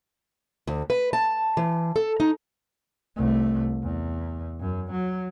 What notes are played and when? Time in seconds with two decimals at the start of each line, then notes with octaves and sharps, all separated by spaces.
0.67 D2
0.90 B4
1.13 A5
1.57 E3
1.96 A4
2.20 D#4
3.16 C2 A3
3.83 E2
4.61 F#2
4.92 F#3